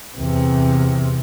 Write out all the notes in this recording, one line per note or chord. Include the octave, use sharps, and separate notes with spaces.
E2 C3